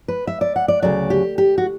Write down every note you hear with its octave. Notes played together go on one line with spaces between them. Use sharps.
B4
E5
D5
F#5
D5
D2 C#3 F#3 D5
G4
G4
F#4